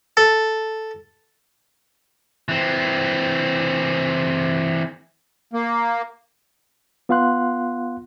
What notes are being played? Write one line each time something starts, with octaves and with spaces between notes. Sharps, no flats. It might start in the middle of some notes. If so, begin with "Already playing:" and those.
A4
E3 C4
A#3
B3 F4 F5 F#5 C6 F#6